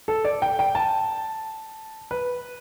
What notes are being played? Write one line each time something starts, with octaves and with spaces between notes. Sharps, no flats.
A4
D5
G5
G5
A5
B4